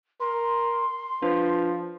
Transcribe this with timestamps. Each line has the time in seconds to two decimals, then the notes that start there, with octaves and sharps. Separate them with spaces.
0.20 A#4 C6
1.22 F3 D4 F4 B4